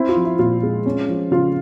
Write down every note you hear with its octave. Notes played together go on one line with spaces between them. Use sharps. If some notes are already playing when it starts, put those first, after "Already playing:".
Already playing: C4 E4
F4
F3
E4
A#2 F4
G#3
C#4
F3
C#3 F4